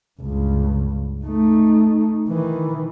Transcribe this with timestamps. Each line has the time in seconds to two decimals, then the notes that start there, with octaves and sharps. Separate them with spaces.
0.21 C#2 G2
1.25 A3 D#4
2.29 D#3 E3